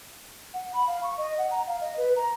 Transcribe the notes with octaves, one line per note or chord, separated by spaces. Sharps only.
F#5
B5
F5
C#6
D#5
F#5
A#5
F5
D#5
B4
A#5